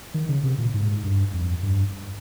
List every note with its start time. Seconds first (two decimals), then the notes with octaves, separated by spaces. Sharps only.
0.14 D#3
0.29 C#3
0.43 C3
0.58 A#2
0.74 G#2
1.03 G2
1.34 F2
1.63 G2